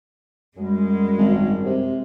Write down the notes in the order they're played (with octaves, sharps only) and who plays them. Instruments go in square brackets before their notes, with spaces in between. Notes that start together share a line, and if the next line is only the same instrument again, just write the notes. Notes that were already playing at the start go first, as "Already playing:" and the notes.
[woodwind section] F#2 G3 [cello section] G#3
[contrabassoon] G#1
C3